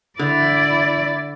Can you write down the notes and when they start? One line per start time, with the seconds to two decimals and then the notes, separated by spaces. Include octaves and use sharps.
0.19 D3 E4 D5